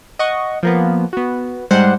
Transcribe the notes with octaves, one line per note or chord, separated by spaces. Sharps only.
D#5 F#5 C#6
F3 A#3 B3
B3 F#4
G#2 G3 G#3 C5 F#5